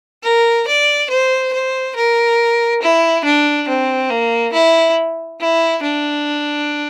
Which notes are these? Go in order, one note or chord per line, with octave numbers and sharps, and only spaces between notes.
A#4
D5
C5
C5
A#4
E4
D4
C4
A#3
E4
E4
D4